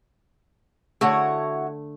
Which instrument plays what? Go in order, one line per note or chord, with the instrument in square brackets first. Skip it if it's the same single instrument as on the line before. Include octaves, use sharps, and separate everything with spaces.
[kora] D3 A3 [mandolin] E4 F#4 C#5